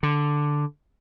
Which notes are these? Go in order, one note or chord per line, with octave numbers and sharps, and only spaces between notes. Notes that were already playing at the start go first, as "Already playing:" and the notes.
D3